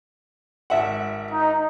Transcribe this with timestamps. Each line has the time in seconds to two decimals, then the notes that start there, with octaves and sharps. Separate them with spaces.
0.70 G#1 E5 F#5
1.32 D#4